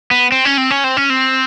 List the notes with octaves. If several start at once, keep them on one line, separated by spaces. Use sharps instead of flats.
B3
C4
C#4
C4
C#4
C4
C#4
C4